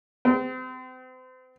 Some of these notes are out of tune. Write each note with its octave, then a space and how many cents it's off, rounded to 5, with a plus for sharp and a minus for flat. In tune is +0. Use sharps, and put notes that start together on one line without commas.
C4 -35